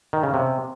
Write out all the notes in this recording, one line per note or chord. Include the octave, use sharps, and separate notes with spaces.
D#3
C#3
C3